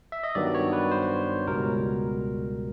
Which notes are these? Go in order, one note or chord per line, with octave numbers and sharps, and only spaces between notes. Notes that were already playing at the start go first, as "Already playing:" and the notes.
E5
D#5
G2 D#3 F#3 B3 D5
C#5
B4
C5
C#2 B2 G3 A#4